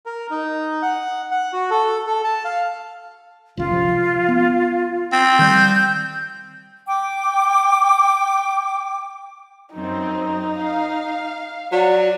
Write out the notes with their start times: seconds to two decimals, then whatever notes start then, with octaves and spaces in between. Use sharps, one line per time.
0.06 A#4
0.31 D#4
0.82 F#5
1.31 F#5
1.53 F#4
1.70 A4
2.07 A4
2.24 A5
2.45 F5
3.57 G#1 C#2 G#2 F4
3.71 C3 F3
4.28 B3
5.12 C4
5.39 D#3 G3 G6
6.87 G5 D6
9.74 F#2 C4 D#4
10.59 F5
11.72 F#3 D5